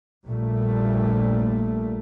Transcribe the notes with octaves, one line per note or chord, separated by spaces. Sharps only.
A#1 A#2 G3 A3